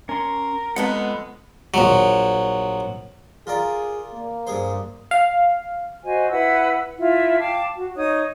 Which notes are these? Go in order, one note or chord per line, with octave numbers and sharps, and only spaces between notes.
C#4 A#4 C6
F2 G#3 B3 A4 B4 F#5
A#1 F#3
F4 G#4 A#4 D5
A#3
G2 G#4 C5
F5
F#4 C5 D#5 G#5
E4 B4 F#5 E6
E4 F4
F5 G5 A5 D6
F#4
D#4 C#5 D#6